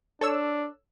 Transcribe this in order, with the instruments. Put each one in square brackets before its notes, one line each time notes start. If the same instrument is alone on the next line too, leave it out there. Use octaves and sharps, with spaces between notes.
[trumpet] D4 [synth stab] A4 C#5 E6